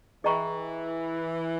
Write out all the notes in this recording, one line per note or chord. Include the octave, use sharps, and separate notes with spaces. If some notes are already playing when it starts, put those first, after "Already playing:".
E3 G#4 D#5 G5 A#5 C#6